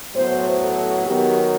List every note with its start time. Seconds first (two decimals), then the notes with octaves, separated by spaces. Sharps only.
0.16 A2 F#3 B3 C5
0.61 A4
1.06 D#3 F#3 B3 G4